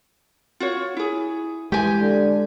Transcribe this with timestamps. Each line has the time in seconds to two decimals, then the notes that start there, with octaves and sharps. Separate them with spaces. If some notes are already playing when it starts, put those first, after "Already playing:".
0.60 F4 F#4 C#5
0.97 E4 G#4
1.72 E3 G#3 G4 G#5
2.01 D3